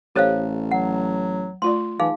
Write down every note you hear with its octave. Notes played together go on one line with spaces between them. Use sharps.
A1 G4 A4 C5 C#5 F5
F#3 F#5
A3 F4 D5 C6
E3 D#4 G#4 F5